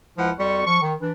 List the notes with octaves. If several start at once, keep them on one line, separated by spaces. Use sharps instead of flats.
C#2 F3 E4 F#5
F2 G3 C4 F#4 C#6
F3 C#6
D#3
E3 D4